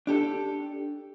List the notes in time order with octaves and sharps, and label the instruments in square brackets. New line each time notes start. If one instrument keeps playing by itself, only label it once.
[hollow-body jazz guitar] D4 G4 A4